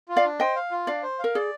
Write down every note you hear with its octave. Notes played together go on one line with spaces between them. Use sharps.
F4
D5 F5
D4
C5 D#5 G5
F5
F4
D4 D5 F5
C5
A#4 F5
G#4 D5